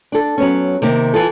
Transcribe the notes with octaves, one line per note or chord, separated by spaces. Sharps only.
D4 A4
F#3 B3 C#4
C3 D#3 A#3
E3 F4 A4